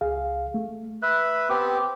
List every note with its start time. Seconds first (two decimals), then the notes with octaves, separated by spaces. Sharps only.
0.01 C#2 G#4 F5
0.54 A3
1.02 B4 E5 F#6
1.50 B3 C4 G4 D6